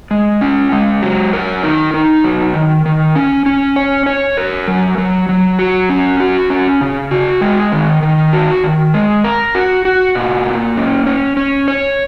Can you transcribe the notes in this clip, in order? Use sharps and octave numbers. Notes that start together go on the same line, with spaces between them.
G#3
C#4
G#3
F#3
A#4
D#4
D#4
F#3
D#3
D#3
C#4
C#4
C#5
C#5
A#4
F#3
F#3
F#3
F#4
C#4
F#4
C#4
C#3
F#4
G#3
D#3
D#3
F#4
D#3
G#3
A#4
F#4
F#4
A#2
A#3
C#4
C#4
C#4
C#5